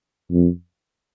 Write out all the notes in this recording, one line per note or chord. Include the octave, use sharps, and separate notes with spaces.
F2